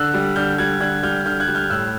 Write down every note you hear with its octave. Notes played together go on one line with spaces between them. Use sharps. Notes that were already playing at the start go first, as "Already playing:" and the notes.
Already playing: D3 E6 F#6
G3
D3 F6 G6
G3 F#6 G#6
D3 F#6 G#6
G3 F6 G6
D3 F6 G6
F#6 G#6
G3
F6 G6
A2 E6 F#6